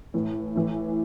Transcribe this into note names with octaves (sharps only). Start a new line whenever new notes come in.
A2 E3
A2 E3